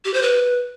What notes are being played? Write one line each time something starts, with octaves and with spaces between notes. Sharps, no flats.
G4
C5
B4